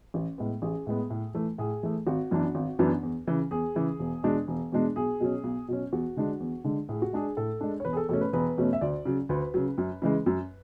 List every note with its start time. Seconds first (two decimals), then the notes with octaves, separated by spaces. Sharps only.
0.14 A1
0.38 A2 G#3 B3
0.62 A1 G#4
0.87 A2 G#3 B3
1.10 A2
1.34 E3 A3
1.58 A2 G#4
1.83 E3 A3
2.06 G#1 F#4
2.31 F#2 E3 B3 D4
2.55 G#1
2.79 F#2 E3 B3 D4
3.03 E2
3.27 C#3 E3
3.51 E2 G#4
3.75 C#3 E3
3.99 E1
4.23 E2 B2 G#3 D4
4.48 E1
4.72 E2 B2 G#3 D4
4.96 B1 G#4
5.20 B2 F#3 C#4
5.44 B1
5.68 B2 F#3 C#4
5.92 E2 F#4
6.17 D3 G#3 D4
6.40 E2
6.64 D3 G#3 D4
6.89 A2 G#4
7.02 F#4
7.13 G#3 D4 G#4
7.37 A2 A4
7.61 G#3 D4
7.80 C#5
7.85 E1 B4
7.93 G#4
7.97 A4
8.09 E2 B2 A3 C#4 A4
8.21 B4
8.33 E1 B4
8.57 E2 B2 A3 C#4
8.73 E5
8.81 D2 D5
9.05 C#3 F#3
9.29 D2 B4
9.54 C#3 F#3
9.78 F#2
10.02 C#3 E3 G#3
10.26 F#2